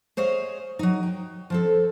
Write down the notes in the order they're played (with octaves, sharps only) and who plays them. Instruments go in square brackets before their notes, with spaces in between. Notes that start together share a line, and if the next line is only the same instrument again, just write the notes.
[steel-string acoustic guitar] G#4 C5 C#5 D#5 F5
F#3 D#4
G5
F3 C4 A4